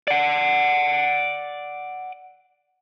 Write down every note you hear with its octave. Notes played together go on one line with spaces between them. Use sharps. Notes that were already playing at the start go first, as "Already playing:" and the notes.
D5 F#5